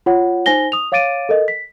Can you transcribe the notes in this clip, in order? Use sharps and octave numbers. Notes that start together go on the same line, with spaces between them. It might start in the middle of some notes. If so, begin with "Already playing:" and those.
F4 C#5 F#5
D#4 C5 G#5 A#6 G7
D#6 F7
C#5 F5 D6 A6 D7 D#7
A4 A#4 D#5
B6